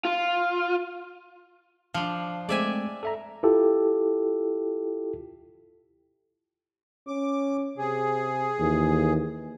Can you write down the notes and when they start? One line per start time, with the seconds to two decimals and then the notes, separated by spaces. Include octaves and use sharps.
0.05 F4
1.94 F3 D4 F5
2.49 G#3 A3 C4 D5 E5 G#5
3.03 A4 E5 A#5
3.43 E4 F4 G4 A4
7.07 C#4 D6
7.78 C3 G#4
8.60 D#2 E3